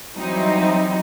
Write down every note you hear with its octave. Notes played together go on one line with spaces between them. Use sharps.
E3 F#3 G3 C4 D#4 E4